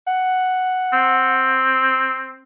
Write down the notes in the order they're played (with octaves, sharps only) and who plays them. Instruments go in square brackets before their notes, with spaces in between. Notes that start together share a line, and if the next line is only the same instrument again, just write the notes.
[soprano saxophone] F#5
[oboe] C4